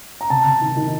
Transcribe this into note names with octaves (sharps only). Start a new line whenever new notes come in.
A#5
C3 A5
C3
D#3
D#3